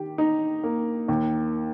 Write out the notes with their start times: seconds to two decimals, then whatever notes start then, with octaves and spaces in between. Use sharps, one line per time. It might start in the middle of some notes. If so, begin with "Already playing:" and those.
Already playing: D#3 G4
0.18 D#4
0.63 A#3
1.08 D#2